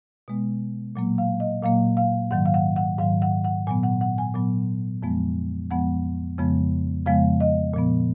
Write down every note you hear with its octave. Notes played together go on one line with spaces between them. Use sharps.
B2 G#3 B3
A#2 F#3 A#3
F5
D#5
A#2 F#3 A#3 F5
F5
G#2 D#3 F#3 F#5
F5
F#5
F#5
G#2 D#3 F#3 F5
F#5
F#5
A#2 F#3 B3 G#5
F#5
F#5
G#5
A#2 F#3 B3
F2 F3 G#3 B3
F2 F3 G#3 B3 F#5
F2 C#3 F3 G#3 B3
F2 C#3 F3 G#3 B3 F5
D#5
A#2 F3 B3